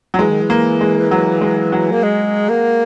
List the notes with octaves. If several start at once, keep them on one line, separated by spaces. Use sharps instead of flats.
F#3
E3 G#3
D#3
E3
A#3
G#3
F#3
G#3
F#3
A#3
G#3
A#3